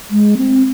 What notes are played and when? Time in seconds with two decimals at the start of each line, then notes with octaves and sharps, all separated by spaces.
0.10 G#3
0.37 C4